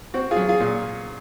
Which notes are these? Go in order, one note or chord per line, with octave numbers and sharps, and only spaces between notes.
C4 F#4
F4 G#4
F#3
F4 G#4
A#2